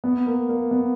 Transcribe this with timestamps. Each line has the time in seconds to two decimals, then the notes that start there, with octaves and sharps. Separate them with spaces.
0.04 B3
0.26 A#3
0.49 A#3
0.71 B3